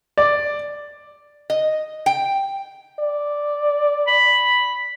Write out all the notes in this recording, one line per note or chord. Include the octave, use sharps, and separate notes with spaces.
D5
D#5
G5
D5
B5